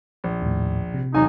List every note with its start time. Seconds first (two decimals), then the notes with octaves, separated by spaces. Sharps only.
0.24 A#1
0.42 D#2 A2
0.94 C3
1.14 E1 B1 D#4 G#5